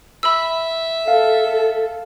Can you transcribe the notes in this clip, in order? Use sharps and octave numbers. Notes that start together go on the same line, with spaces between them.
E5 B5 E6
A4 F5